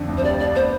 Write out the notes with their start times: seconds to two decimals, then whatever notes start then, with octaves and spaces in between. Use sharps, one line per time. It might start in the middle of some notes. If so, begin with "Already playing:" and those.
Already playing: F2 D3
0.08 D2
0.17 C5
0.24 G3 D5
0.40 D4 D5
0.55 B3 C5